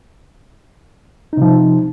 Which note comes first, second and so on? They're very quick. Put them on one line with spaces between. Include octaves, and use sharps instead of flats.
D#4 C3 F3